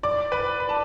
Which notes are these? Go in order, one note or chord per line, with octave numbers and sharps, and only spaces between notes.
D5 D6
B4 B5
B5
A5